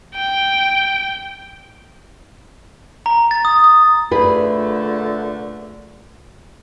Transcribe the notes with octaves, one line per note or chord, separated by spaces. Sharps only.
G5
A#5
A6
D#6
D#6
A#2 D3 A3 G#4 B4